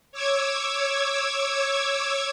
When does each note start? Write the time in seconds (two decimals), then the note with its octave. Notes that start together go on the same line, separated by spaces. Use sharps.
0.12 C#5 D6 E6 G#6